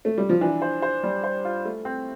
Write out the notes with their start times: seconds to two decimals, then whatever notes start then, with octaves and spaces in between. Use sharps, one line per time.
0.05 A3
0.18 G3
0.29 F3
0.41 E3 D4
0.62 C5
0.82 C5
1.03 G3
1.24 C5
1.45 F4
1.65 A3
1.85 C4